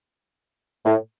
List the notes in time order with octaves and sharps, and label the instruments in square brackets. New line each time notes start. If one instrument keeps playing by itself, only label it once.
[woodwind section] A2